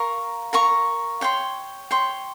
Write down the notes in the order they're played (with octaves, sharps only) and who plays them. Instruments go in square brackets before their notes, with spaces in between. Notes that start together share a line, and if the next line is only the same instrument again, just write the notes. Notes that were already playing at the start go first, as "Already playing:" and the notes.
Already playing: [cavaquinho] A#4 F5 A#5 C#6
A#4 F5 A#5 C#6
C#5 G5 C6
C#5 G5 C6